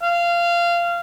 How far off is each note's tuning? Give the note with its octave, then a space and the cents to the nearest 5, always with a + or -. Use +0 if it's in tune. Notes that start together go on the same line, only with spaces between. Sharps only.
F5 -20